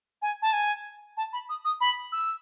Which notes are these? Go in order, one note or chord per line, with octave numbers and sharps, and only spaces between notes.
G#5
A5
G#5
A5
B5
D#6
D#6
B5
E6